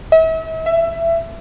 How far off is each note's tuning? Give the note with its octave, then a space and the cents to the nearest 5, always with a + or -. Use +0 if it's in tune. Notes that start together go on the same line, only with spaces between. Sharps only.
E5 -40
E5 +20